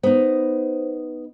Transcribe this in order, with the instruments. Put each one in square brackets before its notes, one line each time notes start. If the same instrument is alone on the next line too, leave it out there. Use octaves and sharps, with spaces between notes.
[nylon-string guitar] B3 D#4 [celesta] C5